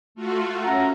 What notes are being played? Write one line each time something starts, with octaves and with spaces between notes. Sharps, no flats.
A3 F4 F#4
C#4 E5 F#5 A#5